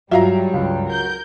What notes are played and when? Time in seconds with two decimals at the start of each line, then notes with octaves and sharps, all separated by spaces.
0.11 G2 F#3 G3 F4 F#4 E5 F5 A#5
0.54 C#2
0.89 A#4 G6